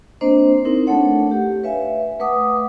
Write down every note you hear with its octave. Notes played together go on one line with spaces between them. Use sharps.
A#3 C4 D4 C5 D#5
C4 D#4 E4 A#4
A3 D4 A4 C#5 F#5
G4
B4 C#5 E5 F5 G#5
A3 B4 F#5 D6 D#6